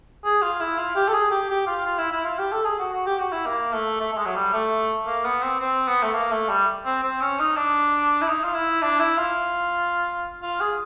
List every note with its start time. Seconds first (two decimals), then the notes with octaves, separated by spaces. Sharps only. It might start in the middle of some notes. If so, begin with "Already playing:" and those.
0.25 G#4
0.42 F4
0.60 E4
0.78 F4
0.95 G4
1.08 A4
1.14 G#4
1.31 G4
1.50 G4
1.67 F4
1.85 F4
1.98 E4
2.12 E4
2.25 F4
2.39 G4
2.52 A4
2.65 G#4
2.79 F#4
2.92 F#4
3.06 G4
3.19 F#4
3.32 E4
3.46 A#3
3.73 A3
4.00 A3
4.12 A3
4.17 G#3
4.26 F#3
4.35 G3
4.53 A3
5.07 A#3
5.25 B3
5.43 C4
5.60 C4
5.87 B3
6.03 A3
6.13 A#3
6.31 A3
6.49 G3
6.85 C4
7.03 C4
7.21 C#4
7.39 D#4
7.56 D4
8.21 E4
8.28 D#4
8.44 F4
8.54 E4
8.82 D4
8.99 E4
9.18 F4
10.42 F4
10.60 G#4